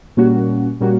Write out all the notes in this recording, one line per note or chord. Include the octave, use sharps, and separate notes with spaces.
A#2 G3 A#3 C#4 F#4
A#2 G3 A#3 C#4 F#4